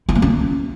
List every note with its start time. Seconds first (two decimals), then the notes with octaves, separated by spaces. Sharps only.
0.09 E4
0.15 A#3
0.22 C#4